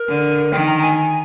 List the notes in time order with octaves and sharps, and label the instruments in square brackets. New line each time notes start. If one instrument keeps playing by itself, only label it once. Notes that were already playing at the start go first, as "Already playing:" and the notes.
Already playing: [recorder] A#4
[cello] D3
[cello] D#3 [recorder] G5
[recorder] A#5
G#5
G#5